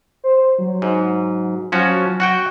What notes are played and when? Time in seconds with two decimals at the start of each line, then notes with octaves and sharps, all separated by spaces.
0.24 C5
0.59 F#3
0.82 G#2
1.72 F3 F#3 C#4 F#4
2.20 F#4 F#5 G5